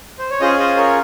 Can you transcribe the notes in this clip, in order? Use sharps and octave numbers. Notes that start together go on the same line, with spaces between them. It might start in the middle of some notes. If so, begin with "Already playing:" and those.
C5
C#5
C#4 F4 G#4 C5 D#5
C5 D#5
A#4 C#5